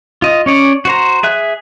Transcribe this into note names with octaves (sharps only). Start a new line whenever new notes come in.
F4 D#5
C#4 C#5 D5
F#4 C5 A#5
G#4 E5 F#6